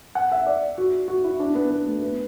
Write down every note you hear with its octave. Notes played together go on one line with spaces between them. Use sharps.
F#5
E5
D5
F#4
F#4
E4
D4
B3
B3
A3
B3